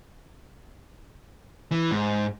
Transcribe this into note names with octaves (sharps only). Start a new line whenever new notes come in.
E3
G#2